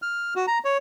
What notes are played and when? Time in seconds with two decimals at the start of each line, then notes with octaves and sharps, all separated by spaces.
0.02 F6
0.36 F#4
0.47 A#5
0.65 C#5